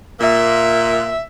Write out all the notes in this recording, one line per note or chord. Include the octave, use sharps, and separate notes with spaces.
A#2 A#3 E5